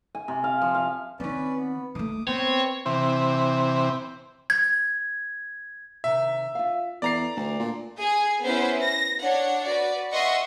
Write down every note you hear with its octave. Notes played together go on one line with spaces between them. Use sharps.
G#5
C3
F5
F3
F5
D#3 C4 C#4 B4 D5
B3
D#3 A3 D6 D#6
B3 C4 B4 C#5
C3 E3 C4
G#6
C3 D#3 E5
F4 F5
E2 A4 B4 D5 A#5 C7
D2 A5
A#2
G#4 G#5
B3 C#4 E4 B4 C5
A#6
D4 C#5 F#5
F#4 B4 D5
D#5 E5 F#5 C6 C#6 D#6